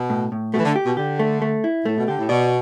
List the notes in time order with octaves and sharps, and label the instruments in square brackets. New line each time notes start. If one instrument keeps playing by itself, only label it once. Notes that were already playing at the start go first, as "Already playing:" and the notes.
Already playing: [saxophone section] B2
[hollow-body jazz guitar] A2
A2
[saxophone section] B2 [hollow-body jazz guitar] A3
[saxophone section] E3
D3
[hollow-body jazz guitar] G4
[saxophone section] B2
[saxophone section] D3 [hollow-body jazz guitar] G4
[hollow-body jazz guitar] A3
A3
E4
[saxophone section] A2 [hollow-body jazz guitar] A3
[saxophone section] B2
[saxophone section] D3 [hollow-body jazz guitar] G4
[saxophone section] A2
[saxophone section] B2 [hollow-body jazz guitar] D5